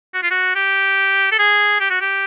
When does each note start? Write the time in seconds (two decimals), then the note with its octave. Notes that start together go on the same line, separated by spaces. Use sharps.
0.14 F#4
0.23 F4
0.31 F#4
0.56 G4
1.32 A4
1.39 G#4
1.81 G4
1.91 F#4
2.01 G4